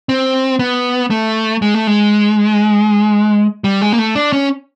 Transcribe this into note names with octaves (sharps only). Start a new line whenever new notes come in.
C4
B3
A3
G#3
A3
G#3
G3
G#3
A#3
A3
D4
C#4